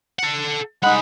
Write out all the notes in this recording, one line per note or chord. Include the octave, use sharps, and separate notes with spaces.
A4 F#5
C2 G#3 D#4 F#5 B5